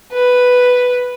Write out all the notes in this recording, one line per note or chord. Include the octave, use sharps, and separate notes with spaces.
B4